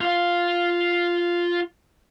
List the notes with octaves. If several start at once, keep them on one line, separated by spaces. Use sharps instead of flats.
F4 F5